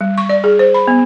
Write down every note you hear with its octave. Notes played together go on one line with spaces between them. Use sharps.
G3
C#6
D5
G#4
C5
B5
B3